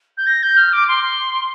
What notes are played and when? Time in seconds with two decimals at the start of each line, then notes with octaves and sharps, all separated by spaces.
0.17 G6
0.26 A#6
0.43 G6
0.57 F6
0.72 D6
0.88 C6